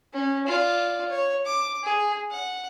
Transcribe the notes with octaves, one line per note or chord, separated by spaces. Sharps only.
C#4
F4 D5
C#5
D6
G#4
F#5